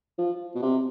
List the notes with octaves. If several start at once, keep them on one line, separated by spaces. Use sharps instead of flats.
F3
B2
C3